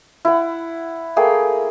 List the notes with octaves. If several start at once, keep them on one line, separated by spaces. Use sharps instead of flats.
E4 F#5
A3 A#3 G#4 G5